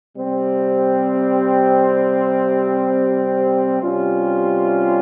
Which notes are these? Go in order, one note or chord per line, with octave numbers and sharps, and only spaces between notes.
C3 G3 C4
C3 G3 C#4 F4